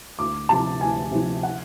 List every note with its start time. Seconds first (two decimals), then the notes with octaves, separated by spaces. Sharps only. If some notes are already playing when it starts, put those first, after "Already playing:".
0.19 D2 D6
0.49 C3 F3 A5
0.81 D2 G#5
1.11 C3 F3
1.43 F#5